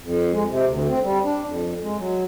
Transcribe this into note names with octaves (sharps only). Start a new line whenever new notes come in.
F2
G#3
C3
D2
C4
G3
D4
F2
G#3
F#3